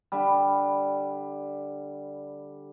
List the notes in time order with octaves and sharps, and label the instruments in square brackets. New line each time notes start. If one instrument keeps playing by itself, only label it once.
[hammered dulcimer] D3 G3